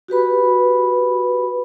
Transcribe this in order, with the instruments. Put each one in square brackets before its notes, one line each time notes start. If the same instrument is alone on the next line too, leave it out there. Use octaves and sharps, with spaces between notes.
[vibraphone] F#4 G4 B4 B5